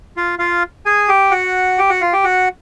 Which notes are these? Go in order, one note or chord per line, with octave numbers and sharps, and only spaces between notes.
F4 F5
F4 F5
G#4 G#5
G4 G5
F#4 F#5
G4 G5
F#4 F#5
F4 F5
G4 G5
F#4 F#5